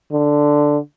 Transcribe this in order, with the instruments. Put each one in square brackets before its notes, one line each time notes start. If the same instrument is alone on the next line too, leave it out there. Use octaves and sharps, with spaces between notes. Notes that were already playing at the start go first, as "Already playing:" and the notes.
[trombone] D3